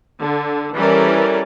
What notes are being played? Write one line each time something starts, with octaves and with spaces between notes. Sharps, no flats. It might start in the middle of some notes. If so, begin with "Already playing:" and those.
D3
E3 G3 C#4 A4 A#4 D5